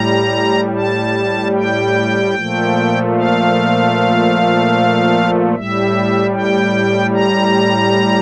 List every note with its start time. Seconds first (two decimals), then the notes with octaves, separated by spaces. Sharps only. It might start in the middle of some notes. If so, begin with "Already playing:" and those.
Already playing: A2 G3 A#5
0.76 A5
1.56 G5
2.36 A#2 F3 A3
3.15 F5
5.55 A2 G3 E5
6.35 G5
7.14 A#5